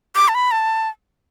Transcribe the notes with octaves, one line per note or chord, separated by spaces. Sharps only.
D6
A5
B5
A5